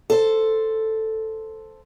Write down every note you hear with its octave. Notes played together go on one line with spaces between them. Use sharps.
A4 C5